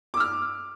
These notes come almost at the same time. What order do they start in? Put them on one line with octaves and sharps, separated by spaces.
D6 E6 F6